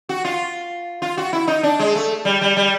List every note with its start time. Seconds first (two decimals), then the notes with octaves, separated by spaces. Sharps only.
0.09 F#4
0.25 F4
1.02 F4
1.17 F#4
1.33 E4
1.48 D#4
1.63 D4
1.79 G#3
1.95 A3
2.25 G3
2.41 G3
2.57 G3